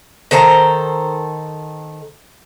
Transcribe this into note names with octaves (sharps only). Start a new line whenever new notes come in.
D#3 A4 C5 A#5